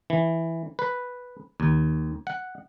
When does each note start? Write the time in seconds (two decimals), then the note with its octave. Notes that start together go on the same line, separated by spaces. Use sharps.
0.10 E3
0.79 B4
1.60 D#2
2.27 F#5